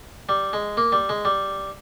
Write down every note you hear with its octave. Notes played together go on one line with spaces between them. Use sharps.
G3
G#3
A#3
G3
G#3
G3